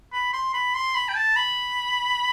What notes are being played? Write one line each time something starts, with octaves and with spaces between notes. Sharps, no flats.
B5
C6
B5
C6
B5
G5
A5
B5